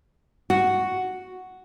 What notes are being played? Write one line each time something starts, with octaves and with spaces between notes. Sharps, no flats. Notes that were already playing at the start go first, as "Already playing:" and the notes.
F#4